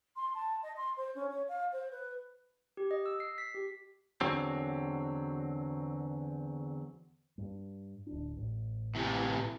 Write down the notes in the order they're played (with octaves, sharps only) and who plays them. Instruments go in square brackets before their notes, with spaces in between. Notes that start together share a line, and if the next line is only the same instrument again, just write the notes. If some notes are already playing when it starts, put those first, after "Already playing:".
[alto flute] C6
A5
D#5
C6
C5
C#4
C#5
F5
C5
B4
[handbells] G4
D#5
E6
C7
B6
G4
[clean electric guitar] E2 D3 F#3 C4
[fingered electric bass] G2
D1 D4
A1
[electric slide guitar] A2 C3 E3